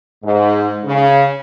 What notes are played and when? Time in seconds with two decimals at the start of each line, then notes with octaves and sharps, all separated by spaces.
0.25 G#2
0.85 C#3